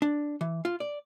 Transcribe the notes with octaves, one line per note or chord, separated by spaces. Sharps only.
D4
E3
F4
D5